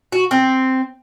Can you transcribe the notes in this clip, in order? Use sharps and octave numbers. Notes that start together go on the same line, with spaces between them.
F#4
C4